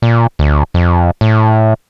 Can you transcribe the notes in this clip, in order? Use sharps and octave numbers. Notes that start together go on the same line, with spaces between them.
A#2
D2
F2
A2